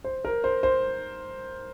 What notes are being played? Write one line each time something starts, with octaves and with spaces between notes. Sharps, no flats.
C5
A#4
C5
C5